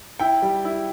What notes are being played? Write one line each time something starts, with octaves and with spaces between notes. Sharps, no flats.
E4 G5
G3
E4